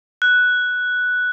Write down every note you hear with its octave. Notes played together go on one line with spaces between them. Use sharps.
F#6